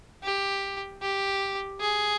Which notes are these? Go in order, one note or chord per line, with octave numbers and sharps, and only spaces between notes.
G4
G4
G#4